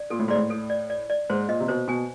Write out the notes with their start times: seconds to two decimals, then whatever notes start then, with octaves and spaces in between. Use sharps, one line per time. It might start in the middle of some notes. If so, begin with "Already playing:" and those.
Already playing: D5
0.10 A#2 A4
0.19 A2
0.28 G#2 D5
0.36 A2
0.50 A4
0.70 D5
0.90 D5
1.10 D5
1.30 G#2 C5
1.48 A#2 D#5
1.60 C3
1.68 B2 C5
1.88 B2 G#5